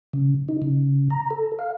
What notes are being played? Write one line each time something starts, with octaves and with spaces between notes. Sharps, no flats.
C#3
D#4
C#3
A#5
A4
F5